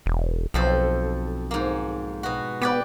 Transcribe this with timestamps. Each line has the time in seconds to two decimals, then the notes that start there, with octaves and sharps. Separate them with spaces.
0.06 E1
0.54 B1 F2 A4 C5
1.51 G#2 A#3
2.23 B2 F#4
2.61 B3 G4 B4 D5